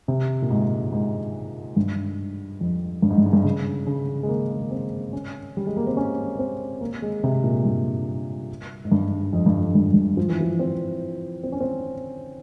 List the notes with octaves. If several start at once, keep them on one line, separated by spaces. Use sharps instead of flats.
C3
A#2
G#2
G#2
G2
F2
G2
G#2
G2
G#2
G2
C#3
C#3
G#3
A#3
A#3
C4
C#4
G3
G#3
A#3
C4
C#4
C4
A#3
G#3
C3
A#2
G2
G#2
G2
F2
G2
F2
G2
F2
G2
F3
E3
F3
C4
C4
C#4
C4